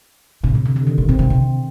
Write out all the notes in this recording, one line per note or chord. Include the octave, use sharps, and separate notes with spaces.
A2 C3
D3
C3
D3
D#3
A#2
A2 C4
A#2
C3